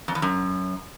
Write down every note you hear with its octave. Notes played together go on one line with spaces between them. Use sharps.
F2
E2
F#2